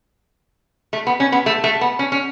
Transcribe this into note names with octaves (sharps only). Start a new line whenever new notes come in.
A3
B3
C#4
B3
A3
A3
B3
C#4
C#4